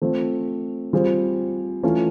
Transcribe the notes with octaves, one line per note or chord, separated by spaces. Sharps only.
F3 A3 C4
G3 C4 F4 G#4 C5
E3 A3 C#4 F4